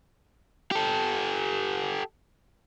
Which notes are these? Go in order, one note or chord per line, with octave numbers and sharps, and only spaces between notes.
G4 A4